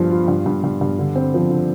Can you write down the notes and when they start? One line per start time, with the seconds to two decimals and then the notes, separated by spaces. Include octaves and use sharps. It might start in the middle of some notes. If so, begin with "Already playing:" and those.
Already playing: G2 F3 F4
0.11 F4
0.28 G2
0.46 G2
0.64 G2
0.81 G2
0.99 D3
1.15 C4
1.34 F3
1.51 D3